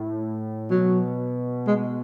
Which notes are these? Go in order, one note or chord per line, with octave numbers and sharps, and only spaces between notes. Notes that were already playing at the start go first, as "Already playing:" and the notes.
Already playing: A2
B2 F#3
G#3